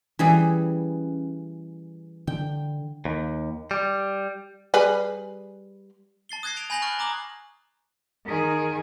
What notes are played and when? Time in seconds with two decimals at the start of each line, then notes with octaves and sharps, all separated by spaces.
0.19 E3 G3 C#4 G#4
2.27 D3 G5
3.05 D#2
3.71 G3
4.74 G3 G#4 B4
6.29 A5 A6 C7 G7
6.43 D#6 F#6 G#6 A#6 C7
6.56 G#6 D7 F7
6.70 G#5 B5 G6 A#6 F7 F#7
6.82 C#6 F6 F#6 A6 D7
6.99 A#5 D6 D#6 F#7
8.25 D#3 G#4